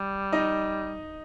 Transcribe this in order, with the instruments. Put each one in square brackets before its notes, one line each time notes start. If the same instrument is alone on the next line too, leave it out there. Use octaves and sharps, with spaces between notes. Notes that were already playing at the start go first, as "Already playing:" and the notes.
Already playing: [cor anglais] G3
[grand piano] D#4 D#5